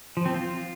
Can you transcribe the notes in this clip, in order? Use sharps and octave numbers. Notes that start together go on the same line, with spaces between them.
F3
C4
F4